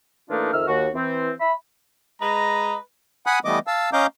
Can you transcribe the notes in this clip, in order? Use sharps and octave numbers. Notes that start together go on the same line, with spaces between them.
E3 A3 A#3 D4 D#4 F4
F2 D#3 E5 E6 F6
D#2 F#4
E3 C4
E5 B5
G#3 B4 D#5 A#5
F#5 G#5 B5 D#6 F#6
E3 G3 A3 B3 D#5 D6
F5 A5 E6
C#4 D#5 F5 A#5 D6 G6